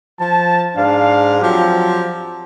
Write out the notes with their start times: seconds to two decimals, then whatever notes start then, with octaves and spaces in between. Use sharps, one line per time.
0.20 F3 A5
0.77 G#2 D4 F5
1.41 F3 F#3 C4 G4